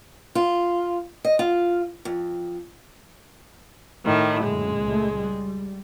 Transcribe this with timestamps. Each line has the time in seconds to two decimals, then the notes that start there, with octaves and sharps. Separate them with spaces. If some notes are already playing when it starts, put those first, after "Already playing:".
0.35 F4
1.25 D#5
1.39 F4
2.05 F2
4.04 A2 D#3
4.42 F#2 A#2 D3 G#3
4.80 C#2 A3
5.15 G3